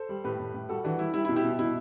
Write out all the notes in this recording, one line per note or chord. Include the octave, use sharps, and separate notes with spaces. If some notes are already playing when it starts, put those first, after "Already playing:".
Already playing: A4 C5
G3
A2 G4 B4
A2
A2
G3 F#4 A4
E3 D4 F#4
G3 E4
G3 E4
E4
B2
E4 G4
B2
B2 E4